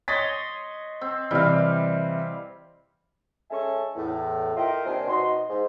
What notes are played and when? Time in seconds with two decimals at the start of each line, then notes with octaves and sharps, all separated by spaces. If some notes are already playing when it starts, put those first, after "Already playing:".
0.08 C#5 D#5 C6 A6 B6
1.01 C4
1.31 C3 E3 G3 F5
3.50 G#3 C#4 A4 E5 G#5 C#6
3.95 E2 A2
4.57 F4 A#4 D#5 E5 G5
4.86 D#2 C3 D4 C5 G#5
5.08 B2 D#4 D#5 C6
5.48 G#2